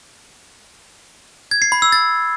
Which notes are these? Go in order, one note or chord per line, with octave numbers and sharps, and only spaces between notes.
G#6
C7
B5
E6
A6